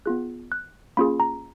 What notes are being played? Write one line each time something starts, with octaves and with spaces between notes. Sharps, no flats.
B3 F4 G#4 F#6
F#6
A#3 C#4 F4 G#4 B5
A#5